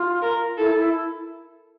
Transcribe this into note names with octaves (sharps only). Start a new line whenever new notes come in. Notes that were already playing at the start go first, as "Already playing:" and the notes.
Already playing: F4
A#4
E4 A4
E4